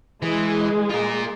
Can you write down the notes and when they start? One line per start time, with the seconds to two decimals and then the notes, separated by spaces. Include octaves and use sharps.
0.22 E3 G#3
0.90 F4 A#4